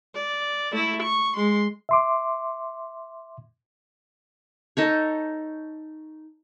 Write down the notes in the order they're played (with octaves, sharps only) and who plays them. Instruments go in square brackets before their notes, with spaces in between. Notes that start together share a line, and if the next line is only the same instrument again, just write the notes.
[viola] D5
A3 E4
C#6
G#3 C6
[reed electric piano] E5 C6 D6
[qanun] D#4 A4 C#5